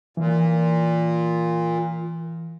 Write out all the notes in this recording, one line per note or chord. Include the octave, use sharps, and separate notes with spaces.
A#2 E3